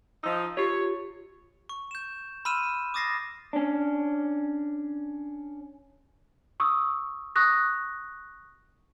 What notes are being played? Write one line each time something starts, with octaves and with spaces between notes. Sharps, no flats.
F3 D#4 E6
F4 G4 C#5
C#6
G6 E7
B5 C6 E6 F6 D#7 E7
D6 D#6 A6 A#6 C7
C#4 D4
C#6 D#6 E6
C#6 D#6 F#6 A#6